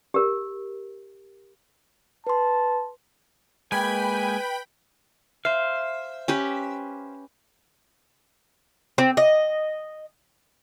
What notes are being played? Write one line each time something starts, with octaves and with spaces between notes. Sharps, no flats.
G4 A#4
B4 A5 C6
G#3 A#3 B4 G5 G#5 B5
C5 E5 F5
C#4 G4 B4
C4
D#5